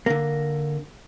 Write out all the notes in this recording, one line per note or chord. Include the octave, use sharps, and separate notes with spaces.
D3 A#3